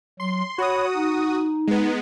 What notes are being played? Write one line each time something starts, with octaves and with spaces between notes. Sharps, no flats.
F#3 C6
F#4 C#5 B5 D#6
D#4
G#3 B3